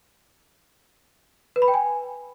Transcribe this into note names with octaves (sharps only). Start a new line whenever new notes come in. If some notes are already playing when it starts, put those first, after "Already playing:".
B4
B5
G5
G#5